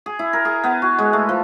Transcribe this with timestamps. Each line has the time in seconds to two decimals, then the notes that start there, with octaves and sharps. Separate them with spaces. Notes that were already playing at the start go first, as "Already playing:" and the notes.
0.06 G#4
0.19 E4
0.33 A#4
0.45 G#4
0.64 B3
0.82 F#4
0.98 G#3
1.13 A3
1.29 F3